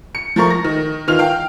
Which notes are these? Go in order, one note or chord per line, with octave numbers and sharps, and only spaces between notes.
C#7
F3 A3 A#4 C#6
A#6
D#3
D#3 E3 F4 F6 F7
F5 G5